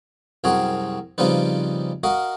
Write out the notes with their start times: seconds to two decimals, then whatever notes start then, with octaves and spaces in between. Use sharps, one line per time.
0.44 C2 F#2 C4 F#4 G#4 A#5
1.18 C#3 F3 G3 C4 D#4 B4
2.03 F#4 A#4 D#5 F5